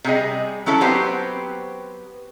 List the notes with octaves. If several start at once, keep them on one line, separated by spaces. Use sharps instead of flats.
C3 G3 G#4 D#5
F#3 C#4 E4 A4 E5
F#3 B3 C4 G4 C5